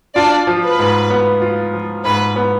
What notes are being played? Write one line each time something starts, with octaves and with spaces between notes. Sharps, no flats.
D4 F4 D5
F3
B4
G#2
B3
F4
F3
G#2 B4
B3